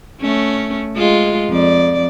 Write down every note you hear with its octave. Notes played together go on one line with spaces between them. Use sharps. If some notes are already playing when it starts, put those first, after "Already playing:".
A3 C#4
G#3 F4
F2 D5